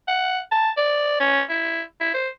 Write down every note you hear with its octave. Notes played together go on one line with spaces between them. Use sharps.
F#5
A5
D5
C#4
E4
E4
C5